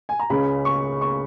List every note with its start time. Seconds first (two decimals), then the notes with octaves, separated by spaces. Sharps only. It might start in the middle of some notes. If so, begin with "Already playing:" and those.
0.09 G#5
0.20 A#5
0.30 C#2 C#3 G#3 C#4 B5
0.65 C#6
1.01 C#6